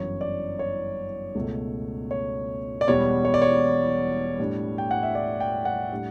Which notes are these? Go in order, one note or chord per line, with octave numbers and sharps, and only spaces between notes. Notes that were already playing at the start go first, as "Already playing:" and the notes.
Already playing: G1 F#2 E3 C#5
D5
C#5
C#2 B2 A3
C#5
D5
E1 E2 B2 G3 B3 C#5
C#5
D5
C#5
A2 G3 D4
G5
F#5
E5
D5
G5
F#5
A2 G3 D4